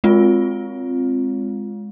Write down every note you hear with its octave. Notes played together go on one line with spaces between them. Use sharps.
G#3 C4 F4